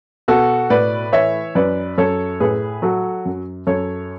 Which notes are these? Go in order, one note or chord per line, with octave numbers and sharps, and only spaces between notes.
B2 F#4 A4
A2 B4 D5
E3 C#5 E5
F#2 B4 D5
F#2 A4 C#5
A2 G#4 B4
F#3 F#4 A4
F#2
F#2 A4 C#5